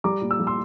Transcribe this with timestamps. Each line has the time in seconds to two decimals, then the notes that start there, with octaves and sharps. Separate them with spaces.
0.04 G3 A#5 D6
0.22 A#2
0.31 E6
0.40 G3
0.47 C6 E6